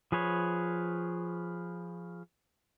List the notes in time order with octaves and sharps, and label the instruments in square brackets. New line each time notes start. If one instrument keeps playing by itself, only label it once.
[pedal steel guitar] F3 G#4 B4 C#5